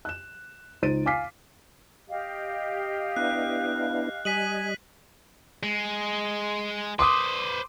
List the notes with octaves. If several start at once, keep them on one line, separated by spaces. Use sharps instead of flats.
F#6 E7
C#2 D#4 C5 A6 D7 D#7
F5 G#5 D6 F6 B6 C7
G4 D#5 F5
B3 D4 E4 F#6
G3 D#5 G#5 B6 D#7 F#7
G#3
B4 C5 C6 D6 D#6